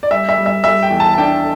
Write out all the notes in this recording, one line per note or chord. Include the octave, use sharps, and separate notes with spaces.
D5
G3 E5
E5
G3
E5
G3 E5
G5
E2
A5
A5
D4 G5